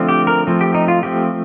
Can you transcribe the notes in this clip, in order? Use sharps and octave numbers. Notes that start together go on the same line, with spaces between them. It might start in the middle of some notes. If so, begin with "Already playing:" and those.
Already playing: D3 F3 A3 C4
G4
A#4
F3 A3 C4
G4
D#4
F4
F3 A3 C4 G4